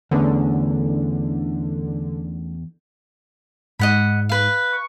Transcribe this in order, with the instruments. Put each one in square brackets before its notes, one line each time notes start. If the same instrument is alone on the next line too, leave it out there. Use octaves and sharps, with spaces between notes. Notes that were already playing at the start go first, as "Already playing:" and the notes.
[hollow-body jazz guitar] E2 [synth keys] D3 [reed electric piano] A3 B3 C#4
[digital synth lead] G#2 [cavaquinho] D#5 F#5 B5
[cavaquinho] B4 F5
[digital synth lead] C#6